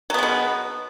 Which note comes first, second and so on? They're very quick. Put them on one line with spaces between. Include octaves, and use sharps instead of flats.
F#3 B3 G#3 B2